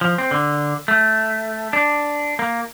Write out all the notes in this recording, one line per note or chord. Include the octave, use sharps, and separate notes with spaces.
F3
C4
D3
A3
D4
A#3